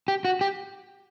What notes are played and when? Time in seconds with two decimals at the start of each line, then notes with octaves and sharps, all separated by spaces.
0.08 G4
0.25 F#4
0.41 G4